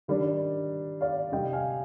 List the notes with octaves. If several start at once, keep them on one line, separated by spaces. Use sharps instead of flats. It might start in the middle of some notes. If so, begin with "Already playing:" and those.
D#3 G3 D4
D5 F5
C3 G3 C4 D#4 D#5 G5
F5 G#5